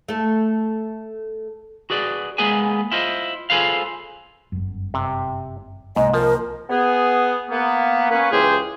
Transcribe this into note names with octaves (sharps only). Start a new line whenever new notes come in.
A3 A4
F#4 G#4 B4 D5
G#3 A#3 B3 G#4 B4 G#5
E4 F4 C5 D#5
F4 G#4 A4 B4 C5 F5
G1 F#2
C3
C2 G#2 A#3 D#5
F3 A#4
B3 G#4
A#3 B3
A#3 C#4 B4
C#2 E3 G4 G#4 C5